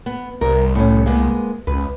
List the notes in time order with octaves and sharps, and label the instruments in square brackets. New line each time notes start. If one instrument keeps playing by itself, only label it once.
[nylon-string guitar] B3
[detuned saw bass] C2 [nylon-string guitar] A#4
[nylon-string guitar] A2 C#4
G#3 A#3 B3
[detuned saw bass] C#2 [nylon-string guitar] B4